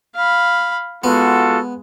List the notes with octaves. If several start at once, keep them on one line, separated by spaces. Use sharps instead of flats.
F5 B5
G#3 B3 F4 F#4 A4